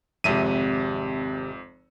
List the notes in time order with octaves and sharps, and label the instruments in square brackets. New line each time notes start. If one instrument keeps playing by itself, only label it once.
[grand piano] G#1 C3 [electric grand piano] F2 E5 D#7